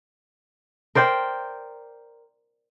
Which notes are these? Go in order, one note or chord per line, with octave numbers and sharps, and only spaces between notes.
A#4 C5 D5 G5